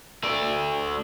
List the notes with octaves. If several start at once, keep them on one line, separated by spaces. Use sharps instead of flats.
A3 D5